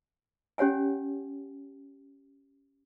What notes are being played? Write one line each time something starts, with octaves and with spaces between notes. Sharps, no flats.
C#4 G4 C#5 F#5 G#5